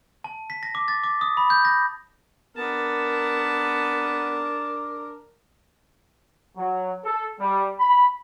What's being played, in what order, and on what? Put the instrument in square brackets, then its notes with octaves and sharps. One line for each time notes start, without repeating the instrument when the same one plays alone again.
[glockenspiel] A5
B6
A#6
D6
A6
D6
D#6
B5
G6
A#6
[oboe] B3 [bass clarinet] D4 [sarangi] A#4 [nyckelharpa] A5
[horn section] F#3
A4
G3
B5